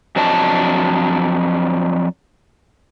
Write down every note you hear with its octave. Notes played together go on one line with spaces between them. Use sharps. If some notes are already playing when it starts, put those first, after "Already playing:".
F2 F#3 D4 D#5 A5